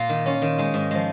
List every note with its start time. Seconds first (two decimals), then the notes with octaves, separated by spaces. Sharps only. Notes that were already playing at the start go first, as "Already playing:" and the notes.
Already playing: A#2 A#3 F4
0.09 D#3
0.26 C#4 F4
0.42 D#3
0.58 G#3 D#4
0.74 G#2
0.91 F3 G#3